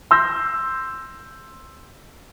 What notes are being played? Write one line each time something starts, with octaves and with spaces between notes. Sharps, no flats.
C6 E6 G6 A#6